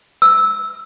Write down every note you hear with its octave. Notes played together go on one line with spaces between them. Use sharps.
E6